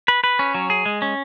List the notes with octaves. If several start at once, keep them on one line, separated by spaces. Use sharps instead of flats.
B4
B4
C#4
F#3
G#4
G#3
C#4